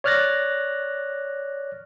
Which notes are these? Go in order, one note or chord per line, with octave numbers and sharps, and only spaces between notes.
C#5 D5 F6 F#6 A6 A#6